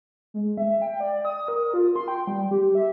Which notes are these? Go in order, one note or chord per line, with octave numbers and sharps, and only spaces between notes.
G#3
E5
G5
D5
D#6
A#4
F4
C6
G5
G3
G4
E5